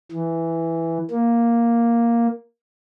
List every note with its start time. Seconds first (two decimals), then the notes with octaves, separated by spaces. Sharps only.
0.12 E3
1.11 A#3